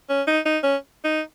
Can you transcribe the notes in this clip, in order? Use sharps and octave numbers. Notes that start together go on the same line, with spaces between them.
C#4
D#4
D#4
C#4
D#4